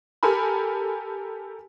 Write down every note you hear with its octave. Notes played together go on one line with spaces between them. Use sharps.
G4 A4 A#4 G#5 B5